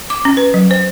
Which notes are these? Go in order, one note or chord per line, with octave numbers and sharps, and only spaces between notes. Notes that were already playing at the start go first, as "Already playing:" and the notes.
D6
C#4
B4
F#3
C5